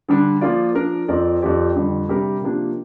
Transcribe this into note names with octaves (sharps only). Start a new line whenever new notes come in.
D3 G3 D4
F3 A#3 F4 D5
F3 D4 A#4
F2 F3 C4 A#4 D5
F2 F3 C4 G4 D5
F2 D3 G3
C3 G3 D4 G4 A#4
C3 F3 A#3 D4 G4